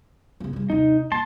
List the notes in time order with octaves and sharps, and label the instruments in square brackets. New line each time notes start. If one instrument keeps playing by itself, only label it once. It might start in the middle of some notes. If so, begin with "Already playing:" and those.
[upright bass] C#3 B3
C#3 G3
[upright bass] D#2 C3 [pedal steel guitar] D#4
[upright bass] A#3 [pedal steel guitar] A5 C6